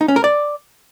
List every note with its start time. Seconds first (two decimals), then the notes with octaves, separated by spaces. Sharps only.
0.01 D#4
0.08 C#4
0.16 A#4
0.24 D5